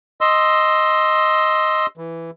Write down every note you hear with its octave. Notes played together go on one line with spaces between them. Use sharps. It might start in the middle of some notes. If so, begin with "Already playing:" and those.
D#5 C6 E6
E3